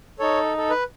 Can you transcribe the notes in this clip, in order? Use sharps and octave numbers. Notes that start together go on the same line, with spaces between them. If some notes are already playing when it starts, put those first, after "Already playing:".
D#4 A4 C#5
A4
B4